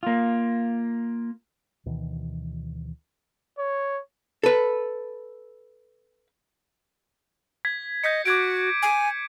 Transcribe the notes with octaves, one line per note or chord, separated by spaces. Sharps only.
A#3 F4
D2 B2 D#3 E3
C#5
A4 B4
G#6 B6
D#5 G6 B6 C#7
F#4 D6 G#6 D7
G#5